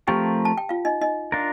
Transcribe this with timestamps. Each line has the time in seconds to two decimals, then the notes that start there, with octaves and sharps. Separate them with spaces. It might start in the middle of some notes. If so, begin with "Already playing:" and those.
0.08 F3 A3 C4 F4 G4 A#4 G5
0.45 A5
0.58 G5
0.69 F4 F5
0.85 D#4 D#5
1.01 D#4 D#5
1.32 D4 F4 A#4